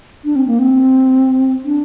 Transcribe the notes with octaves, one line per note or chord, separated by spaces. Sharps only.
D4
C4
A#3
C4
D4